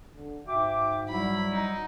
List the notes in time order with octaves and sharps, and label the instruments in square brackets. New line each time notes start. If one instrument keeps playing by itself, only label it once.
[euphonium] D3
[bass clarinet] G#2 [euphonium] F#4 [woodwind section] E5 G5 D6
[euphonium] F#3 [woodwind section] G3 E4 [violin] B5
[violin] D#4